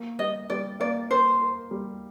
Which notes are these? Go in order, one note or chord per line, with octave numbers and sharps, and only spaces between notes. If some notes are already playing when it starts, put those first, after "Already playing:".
Already playing: A#3
G3 D#5
G3 D5
A#3 D5
A#4 C5
A#4
G3